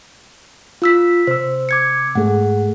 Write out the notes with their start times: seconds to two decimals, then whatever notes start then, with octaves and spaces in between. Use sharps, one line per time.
0.82 F4 E6 B6
1.27 C3 C5 E6
1.69 D6 G#6 C#7
2.15 G#2 A3 G#4 F#5